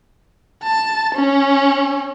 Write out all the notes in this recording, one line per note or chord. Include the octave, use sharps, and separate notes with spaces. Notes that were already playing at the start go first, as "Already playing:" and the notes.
A5
C#4